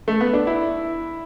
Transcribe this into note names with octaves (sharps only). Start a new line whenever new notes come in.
A3
B3
D4
E4